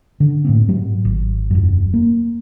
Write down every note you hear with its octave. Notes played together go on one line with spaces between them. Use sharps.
D3
A2 A#3 C4
G#2 F#3
G#1
E1 F#2
A#3